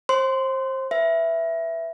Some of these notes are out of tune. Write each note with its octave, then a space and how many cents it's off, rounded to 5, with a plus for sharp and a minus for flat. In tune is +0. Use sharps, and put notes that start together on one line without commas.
C5 +25 C6 -15
B4 +5 E5 +5